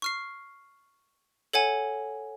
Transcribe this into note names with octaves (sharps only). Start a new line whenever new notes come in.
C#6 F6 C7
A4 C#5 F#5 G#5